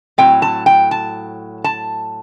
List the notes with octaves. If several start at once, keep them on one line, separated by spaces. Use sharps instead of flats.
A2 F#3 C4 G5
A5
G5
A5
A5